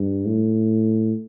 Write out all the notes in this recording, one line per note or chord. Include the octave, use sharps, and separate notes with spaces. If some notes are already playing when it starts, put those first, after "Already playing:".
Already playing: G2
A2